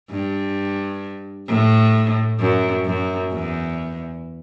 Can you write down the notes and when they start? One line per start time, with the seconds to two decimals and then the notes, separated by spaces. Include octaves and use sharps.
0.10 G2
1.48 A2
2.40 F#2
2.85 F#2
3.32 E2